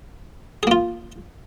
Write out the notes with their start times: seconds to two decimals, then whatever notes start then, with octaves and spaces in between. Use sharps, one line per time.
0.63 G#4
0.67 A#3
0.71 F4